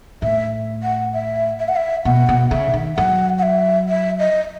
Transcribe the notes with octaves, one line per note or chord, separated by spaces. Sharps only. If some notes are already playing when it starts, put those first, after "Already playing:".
A2 E5
F#5
E5
E5
F#5
E5
B2 F#5
B2
C#3 E5
D#3
F#3 F#5
F#5
E5
E5
D#5